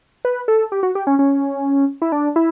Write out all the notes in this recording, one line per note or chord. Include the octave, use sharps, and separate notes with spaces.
B4
A4
G4
F#4
G4
C#4
C#4
E4
D4
E4